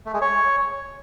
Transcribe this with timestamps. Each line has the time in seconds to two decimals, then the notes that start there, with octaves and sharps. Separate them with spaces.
0.06 A3
0.14 G#3
0.21 C#5